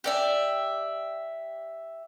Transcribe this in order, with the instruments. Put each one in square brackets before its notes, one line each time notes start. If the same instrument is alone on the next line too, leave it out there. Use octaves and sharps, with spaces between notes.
[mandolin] G4 D5 E5